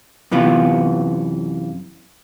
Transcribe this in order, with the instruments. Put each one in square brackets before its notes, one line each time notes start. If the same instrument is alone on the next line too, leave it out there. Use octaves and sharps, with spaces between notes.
[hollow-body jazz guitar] F#2 C3 E3 B3 F4